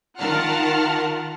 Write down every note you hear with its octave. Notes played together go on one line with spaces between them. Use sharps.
D#3 F4 A#4 F#5 A5 F6